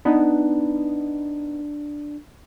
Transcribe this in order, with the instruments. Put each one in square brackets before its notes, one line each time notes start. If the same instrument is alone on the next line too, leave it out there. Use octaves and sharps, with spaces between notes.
[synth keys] B3 D#4 [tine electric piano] D4